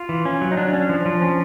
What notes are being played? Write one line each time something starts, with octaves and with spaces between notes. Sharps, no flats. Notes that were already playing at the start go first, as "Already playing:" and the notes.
Already playing: F4
E3
C#4
F#3
D#4
F#3 D4
C#4
F3
F3
C#4